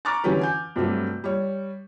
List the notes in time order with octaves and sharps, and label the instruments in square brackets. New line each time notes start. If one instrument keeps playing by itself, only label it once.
[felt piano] A#5 C#6 D6 F6 F#6 A6
D3 E3 F#3 C#4 G4 B4
G#5 G6
G2 C3 F#3 A3
G3 C#5